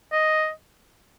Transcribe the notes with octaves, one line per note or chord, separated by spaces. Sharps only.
D#5